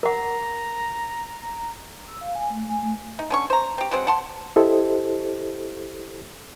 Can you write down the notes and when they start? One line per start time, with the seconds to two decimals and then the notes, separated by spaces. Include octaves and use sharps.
0.03 A#4 F#5 A#5
2.08 E6
2.21 F5
2.35 G#5
2.50 A3
2.69 G#5
2.82 A3
3.19 D#4
3.30 D3 C#4 C#6
3.50 C5 A#5
3.78 C4 G4
3.91 F#3 G#3 C4 F#5
4.07 F#5 A5 C6
4.56 E4 G4 A4 C5 D#5